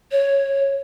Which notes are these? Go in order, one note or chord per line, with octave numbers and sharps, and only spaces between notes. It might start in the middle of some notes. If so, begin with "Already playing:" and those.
C#5